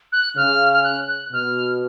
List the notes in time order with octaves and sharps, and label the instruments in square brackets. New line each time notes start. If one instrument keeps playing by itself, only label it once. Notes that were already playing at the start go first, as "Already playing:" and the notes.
[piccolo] F#6
[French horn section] C#3 [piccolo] F6
[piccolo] F6
F#6
F#6
[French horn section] B2 [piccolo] F6